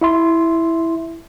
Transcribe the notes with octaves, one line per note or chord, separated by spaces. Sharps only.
E4 E5 C6